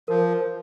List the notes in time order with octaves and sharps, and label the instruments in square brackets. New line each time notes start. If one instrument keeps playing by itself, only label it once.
[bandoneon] F3 [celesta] A#4